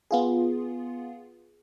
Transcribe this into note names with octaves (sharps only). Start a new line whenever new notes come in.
B3 F4 G#4